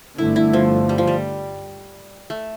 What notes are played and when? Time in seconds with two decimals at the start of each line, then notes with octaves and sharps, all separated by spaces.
0.18 G1 G2 D3 A3 E4
0.36 E4
0.53 F3
0.89 G3
0.98 F3
1.07 G3
2.30 A3